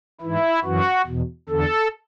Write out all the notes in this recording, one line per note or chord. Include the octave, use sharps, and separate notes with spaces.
G#2 E3 E4
F#2 E3 F#4
E2 B2
E2 D3 A4